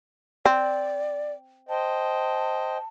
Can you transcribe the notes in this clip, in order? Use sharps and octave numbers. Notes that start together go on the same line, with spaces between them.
C4 D5
C5 D#5 G5 A5